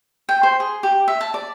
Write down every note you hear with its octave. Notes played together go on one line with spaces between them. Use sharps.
G5
C5
G#4
G4
E5
A5
D5